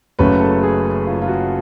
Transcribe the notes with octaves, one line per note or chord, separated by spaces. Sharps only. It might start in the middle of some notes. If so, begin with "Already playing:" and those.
F#1 F#2 C#3 F#3 A3 B4
A4
G#4
F4
F4
F#4